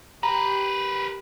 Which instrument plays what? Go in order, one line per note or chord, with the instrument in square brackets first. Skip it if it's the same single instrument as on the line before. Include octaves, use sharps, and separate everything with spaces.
[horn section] G4 [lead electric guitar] A#4 B4 [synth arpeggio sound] A#5